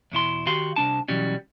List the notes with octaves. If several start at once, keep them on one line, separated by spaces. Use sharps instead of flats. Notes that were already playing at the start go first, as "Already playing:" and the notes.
E2 B2 E4 C6
D#3 F#4 G4 F5 C6
C2 D4 A5
B2 E3 F#3 G3 C#4